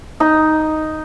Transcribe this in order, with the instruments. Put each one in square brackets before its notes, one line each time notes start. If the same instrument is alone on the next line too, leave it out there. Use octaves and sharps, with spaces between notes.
[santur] D#4